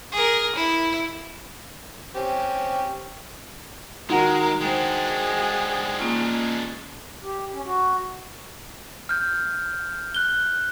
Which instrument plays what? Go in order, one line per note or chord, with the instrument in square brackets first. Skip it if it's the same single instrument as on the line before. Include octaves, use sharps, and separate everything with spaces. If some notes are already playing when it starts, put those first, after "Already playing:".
[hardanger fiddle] G#4 A#4
E4
[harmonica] C4 C#4 G4
[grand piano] D#3 F#4 [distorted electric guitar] G#3 [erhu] A#4
[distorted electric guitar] G#3 D4 [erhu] G#4 [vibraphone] C5 G5
[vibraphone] A#3 C#4 F4
[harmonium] G4
C#4
F#4
[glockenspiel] F6 G6
F#6 G7